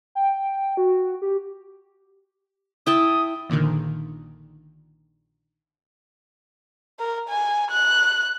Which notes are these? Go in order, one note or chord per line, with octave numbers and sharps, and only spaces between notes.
G5
F#4
G4
E4 G5 A5 D#6
A#1 A#2 D3 D#3
A#4
G#5
F#6